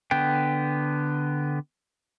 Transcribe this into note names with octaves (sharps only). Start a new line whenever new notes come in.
D3 B3 G5